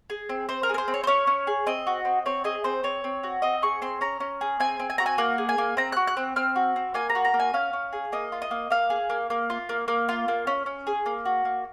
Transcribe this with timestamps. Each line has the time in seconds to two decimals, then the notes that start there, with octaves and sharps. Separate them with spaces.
0.10 G#4
0.29 C4
0.49 C4 C5
0.63 A#4
0.69 G#4
0.74 A#4
0.78 C5
0.88 C4
0.94 C#5
1.04 C5
1.07 C#4 C#5
1.27 C#4
1.47 G#4
1.67 C4 D#5
1.87 F#4
2.05 C4
2.26 C4 C#5
2.44 G#4 D#5
2.64 C4 C5
2.84 C4 C#5
3.04 C4
3.24 F#4
3.42 C4 D#5
3.62 G#4 C#6
3.82 C4 C6
4.01 C#4 A#5
4.20 C#4
4.41 G#4
4.60 C4 G#5
4.80 C4
4.90 G#5
4.98 F#4 A#5
5.06 G#5
5.18 A#3 F#5
5.38 G#4
5.49 G#5
5.58 A#3
5.77 C4 A#5
5.92 F#4 F#6
6.07 F#6
6.17 C4
6.36 C4 F6
6.56 F#4
6.76 C4
6.94 A#3 G#5
7.10 A#5
7.15 F#4
7.25 A#5
7.34 A#3
7.40 G#5
7.54 C#4 F5
7.73 C#4
7.93 G#4
8.12 A#3 D#5
8.32 F4
8.42 D#5
8.51 A#3
8.70 A#3 F5
8.90 G#4
9.10 A#3
9.30 A#3
9.50 F4
9.69 A#3
9.88 A#3
10.09 F4
10.28 A#3
10.47 C#4
10.66 C#4
10.87 G#4
11.06 A#3
11.25 F#4
11.45 A#3